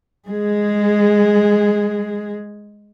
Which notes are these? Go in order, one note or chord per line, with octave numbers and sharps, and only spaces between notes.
G#3 G#4